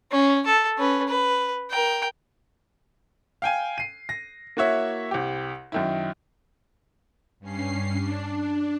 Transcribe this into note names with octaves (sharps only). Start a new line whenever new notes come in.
C#4
A4
C#4 B4
B4
A#4 G5
F5 G5 G#5
C7 D#7
A#6
A#3 E4 F#4 C#5 E5
C2 G4
F#2 D#3 E4
G2 C#4 C7
D4